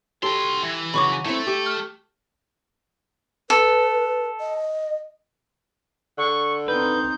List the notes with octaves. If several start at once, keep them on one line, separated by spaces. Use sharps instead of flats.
F#4 G4 A4 C6
E3
C#3 F#3 F#4 B5 C#6 D6
A3 C4 E4
G4
F6
A4 B4
D#5
D3 C#6
C4 D#4 B4 G6